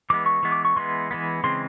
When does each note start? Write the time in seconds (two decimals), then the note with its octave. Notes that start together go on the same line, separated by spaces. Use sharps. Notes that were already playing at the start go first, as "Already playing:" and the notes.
0.10 E3 G#3 B3 D6
0.26 C#6
0.43 E3 G#3 B3
0.52 D6
0.65 C#6
0.76 E3 G#3 B3 C6
1.11 E3 G#3 B3
1.44 C#3 E3 G#3 C4 C6